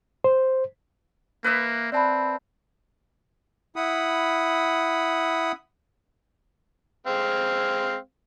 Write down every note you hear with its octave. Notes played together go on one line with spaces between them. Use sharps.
C5
A#3 B4 E5
C4 D5 A5 B5
E4 F#5 B5 D#6
G#3 C4 F5